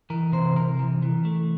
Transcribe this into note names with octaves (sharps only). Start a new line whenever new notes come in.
E3 A#4
C3 C5
C3 A#4
E3
E3
A3